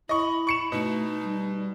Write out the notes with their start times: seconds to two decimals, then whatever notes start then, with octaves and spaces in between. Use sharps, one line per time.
0.09 E4 D#5 B5 C#6
0.47 C#6 C#7 E7
0.72 B2 A3 D#4
1.23 G3